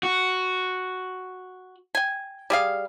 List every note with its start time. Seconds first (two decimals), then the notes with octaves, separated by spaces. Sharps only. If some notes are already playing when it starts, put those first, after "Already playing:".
0.03 F#4
1.95 G5 G#5
2.50 G3 G#4 F5